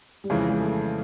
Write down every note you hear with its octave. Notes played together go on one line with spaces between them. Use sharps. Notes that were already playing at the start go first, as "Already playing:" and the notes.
G3
F2 C#3 E3 G#3
G#3
A3